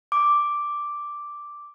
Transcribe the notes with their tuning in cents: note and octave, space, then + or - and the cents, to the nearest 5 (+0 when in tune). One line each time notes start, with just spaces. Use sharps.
D6 +0